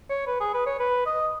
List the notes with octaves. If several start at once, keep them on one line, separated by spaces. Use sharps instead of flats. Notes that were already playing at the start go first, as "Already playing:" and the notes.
C#5
B4
G#4
B4
C#5
B4
D#5